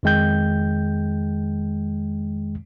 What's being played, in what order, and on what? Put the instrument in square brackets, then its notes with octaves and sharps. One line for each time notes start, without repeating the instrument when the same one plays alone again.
[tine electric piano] F2 D#3 G#3 G5 G6